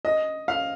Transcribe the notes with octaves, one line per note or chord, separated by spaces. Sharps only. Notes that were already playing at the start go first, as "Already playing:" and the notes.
D#5
F5